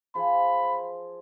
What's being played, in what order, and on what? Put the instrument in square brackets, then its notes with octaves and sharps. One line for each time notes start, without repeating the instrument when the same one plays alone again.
[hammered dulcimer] F3 G#4 [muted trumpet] B5